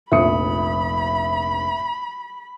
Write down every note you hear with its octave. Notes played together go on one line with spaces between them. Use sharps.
F1 A#1 E5 B5 D#6 C#7